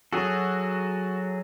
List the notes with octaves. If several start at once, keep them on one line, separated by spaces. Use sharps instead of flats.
F#3 F#4 G#4 A4